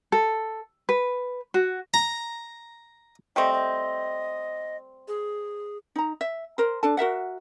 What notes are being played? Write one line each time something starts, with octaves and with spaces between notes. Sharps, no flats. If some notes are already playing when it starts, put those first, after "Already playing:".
A4
B4
F#4
A#5
G3 A3 C4 D#5
D#5
G#4
D#4 A#5
E5
A#4 C5
D4 A4 A5
F#4 A#4 E5 F#5